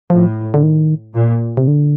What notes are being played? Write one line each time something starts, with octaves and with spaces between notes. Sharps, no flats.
A2 F3
D3
D#3
A#2
C3
D3